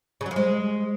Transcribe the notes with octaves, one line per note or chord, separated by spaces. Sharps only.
C#3
F#3
F3
G#3